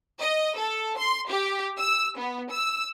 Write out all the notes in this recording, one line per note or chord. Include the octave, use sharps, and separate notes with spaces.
D#5
A4
C6
G4
E6
B3
E6